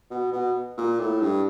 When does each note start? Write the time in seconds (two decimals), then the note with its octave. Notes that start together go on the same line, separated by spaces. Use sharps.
0.10 B2
0.33 B2
0.77 A#2
1.00 A2
1.21 G2